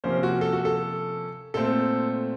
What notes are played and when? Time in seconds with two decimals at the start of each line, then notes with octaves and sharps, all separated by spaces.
0.04 C3 F3 A#3 C#4 C5
0.23 F#4
0.41 A4
0.53 F#4
0.65 A4
1.54 A#2 A3 C4 A4